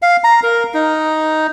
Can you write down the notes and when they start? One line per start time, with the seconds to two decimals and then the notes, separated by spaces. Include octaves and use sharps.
0.02 F5
0.24 A#5
0.43 A#4
0.74 D#4